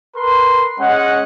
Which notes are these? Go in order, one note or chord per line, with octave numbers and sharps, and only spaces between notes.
A#4 B4 C6
G#3 C#4 D#5 F#5